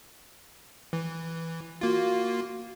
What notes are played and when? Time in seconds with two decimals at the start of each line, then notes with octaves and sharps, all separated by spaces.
0.93 E3
1.81 A#3 F4 F#4